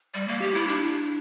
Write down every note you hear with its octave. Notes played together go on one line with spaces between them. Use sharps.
G3
A#3
G4
E4
D4